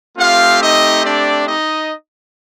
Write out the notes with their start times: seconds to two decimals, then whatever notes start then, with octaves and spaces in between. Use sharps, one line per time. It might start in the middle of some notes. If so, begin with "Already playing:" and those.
0.18 A3 C4 F4 G4 F5
0.61 D#4 D#5
1.04 D4 D5
1.47 D#4 D#5